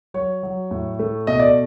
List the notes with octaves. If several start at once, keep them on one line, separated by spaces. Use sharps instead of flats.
F#3 C#5
F#3
A2
A3
B2 D#5
D5